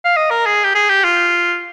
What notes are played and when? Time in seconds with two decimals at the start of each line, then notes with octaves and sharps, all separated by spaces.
0.05 F5
0.16 D#5
0.31 A#4
0.46 G#4
0.64 G4
0.75 G#4
0.89 G4
1.04 F4